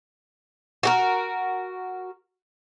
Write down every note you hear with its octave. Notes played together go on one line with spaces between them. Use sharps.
F#4 G4 A#4